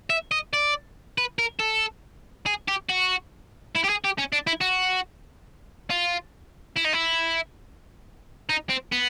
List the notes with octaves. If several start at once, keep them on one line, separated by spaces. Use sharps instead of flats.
E5
D#5
D5
B4
A#4
A4
G#4
G4
F#4
E4
G4
G#4
G4
C#4
D4
E4
F#4
F4
E4
D#4
E4
D#4
C4
B3